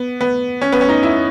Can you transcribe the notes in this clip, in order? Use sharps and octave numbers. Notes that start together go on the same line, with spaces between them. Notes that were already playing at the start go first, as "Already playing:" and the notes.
Already playing: B3
B3
C#4
B3
C#4
D#4
E4